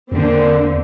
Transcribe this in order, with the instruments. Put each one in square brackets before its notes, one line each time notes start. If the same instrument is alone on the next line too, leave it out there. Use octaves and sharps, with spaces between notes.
[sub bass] E2 [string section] D3 A#3 C4